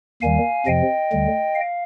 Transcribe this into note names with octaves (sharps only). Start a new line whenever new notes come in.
D#2 D#3 G3 F5 G#5
F2 C3 F3 D#5 G5
D2 D3 G3
F5